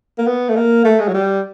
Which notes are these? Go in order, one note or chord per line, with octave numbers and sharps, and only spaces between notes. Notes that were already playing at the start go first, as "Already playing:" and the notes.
A#3
B3
A3
A#3
A3
G#3
F#3
G3